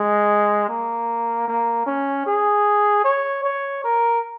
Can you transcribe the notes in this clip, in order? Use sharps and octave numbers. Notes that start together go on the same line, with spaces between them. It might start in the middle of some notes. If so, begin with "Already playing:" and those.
Already playing: G#3
A#3
A#3
C#4
G#4
C#5
C#5
A#4